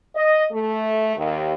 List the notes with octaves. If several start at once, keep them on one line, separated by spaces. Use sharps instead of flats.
D#5
A3
D#2